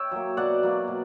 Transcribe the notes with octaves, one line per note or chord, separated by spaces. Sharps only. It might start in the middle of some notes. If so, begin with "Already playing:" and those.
Already playing: C#5 E5 G5
F#3 A#3
B2 D5 F#5
F#3 A#3
B2